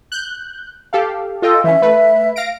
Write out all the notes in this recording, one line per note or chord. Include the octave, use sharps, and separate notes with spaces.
F#6 G6
G4 A4 F5
F4 A4 D#5 G5
E3 C#4 E5
A3 B4
F5 A#6 D7